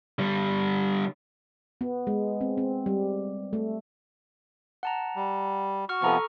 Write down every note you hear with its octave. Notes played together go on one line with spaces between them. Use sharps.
D3 G3
B3
G#3
C4
C4
G3
A3
F#5 A5 A#5
G3
F#4 C#6 F6
C3 F3 B3 A4 A#5 C#6